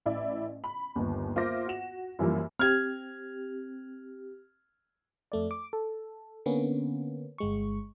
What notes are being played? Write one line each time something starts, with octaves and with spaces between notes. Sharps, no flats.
A1 E4 D5
B5
G1 D#2
A#3 F4 C5 E5 D6 A#6
F#4 F#5 E7
F#2 E3 F3 G3 A#3
C4 G4 F6 G#6
F2 A3 D5
D6
A4
D3 A#3 B3 C#4
G1 G#3 C#6